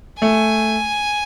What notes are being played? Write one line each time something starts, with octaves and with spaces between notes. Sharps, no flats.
A3 G#5